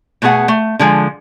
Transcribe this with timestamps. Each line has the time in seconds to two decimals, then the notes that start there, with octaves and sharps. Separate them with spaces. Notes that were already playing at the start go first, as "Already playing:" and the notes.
0.22 B2 A3 B3 G#4 F#5
0.48 A3
0.79 D3 F3 G#3